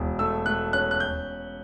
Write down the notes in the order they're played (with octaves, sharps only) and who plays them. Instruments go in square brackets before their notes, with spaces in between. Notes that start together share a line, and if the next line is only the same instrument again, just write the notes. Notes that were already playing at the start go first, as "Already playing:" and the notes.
Already playing: [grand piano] E1
A3 E6
A3 F#6
C#4 F#6
F#6
G6